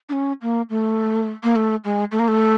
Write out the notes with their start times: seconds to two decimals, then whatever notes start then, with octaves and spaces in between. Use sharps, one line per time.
0.09 D4
0.12 C#4
0.42 A#3
0.70 A3
1.43 A#3
1.56 A3
1.84 G#3
2.11 A3
2.19 A#3
2.28 A3